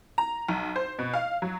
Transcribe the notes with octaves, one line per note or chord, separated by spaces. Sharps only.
A#5
B1
C5
B2
F5
F#3